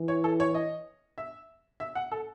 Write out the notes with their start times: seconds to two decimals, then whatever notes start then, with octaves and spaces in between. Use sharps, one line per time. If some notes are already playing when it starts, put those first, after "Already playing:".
Already playing: E3
0.08 C#5
0.24 A4
0.40 C#5
0.54 D#5
1.18 E5
1.80 E5
1.95 F#5
2.12 A4